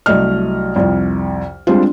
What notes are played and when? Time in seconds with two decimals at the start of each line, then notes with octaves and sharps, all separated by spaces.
0.06 C2 F#3 A3 D#5 F6
0.76 C2 F2
1.67 G3 G#3 C4 D4 F4